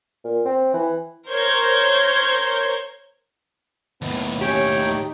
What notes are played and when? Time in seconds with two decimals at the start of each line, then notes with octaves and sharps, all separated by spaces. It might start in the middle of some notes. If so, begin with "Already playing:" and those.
0.24 A#2
0.45 C4
0.73 E3
1.28 A#4 C5 C#5 G6 G#6
4.02 D#2 A2 B3
4.41 C#4 G4 C#5 G5
4.77 D#4